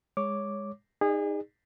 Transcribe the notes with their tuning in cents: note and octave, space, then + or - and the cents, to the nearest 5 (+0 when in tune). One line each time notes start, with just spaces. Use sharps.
G#3 -20 C#5 +0 D6 +0
D#4 +0 G#4 -30 D5 +30